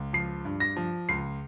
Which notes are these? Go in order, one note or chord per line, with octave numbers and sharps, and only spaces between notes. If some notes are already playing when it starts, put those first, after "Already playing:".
Already playing: C#2
F3 C7
G2
A#6
F3
C#2 C7